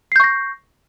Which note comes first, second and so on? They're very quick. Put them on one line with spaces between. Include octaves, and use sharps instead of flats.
C7 G6 C#6 A#6